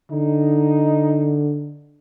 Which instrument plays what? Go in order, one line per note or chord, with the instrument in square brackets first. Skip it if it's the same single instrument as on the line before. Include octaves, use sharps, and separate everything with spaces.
[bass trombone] D3 [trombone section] D#4